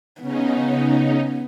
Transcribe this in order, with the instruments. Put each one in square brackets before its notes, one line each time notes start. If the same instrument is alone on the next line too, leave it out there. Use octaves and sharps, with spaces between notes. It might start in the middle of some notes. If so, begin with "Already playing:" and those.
[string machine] C#3 C#4 D#4 [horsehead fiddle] B3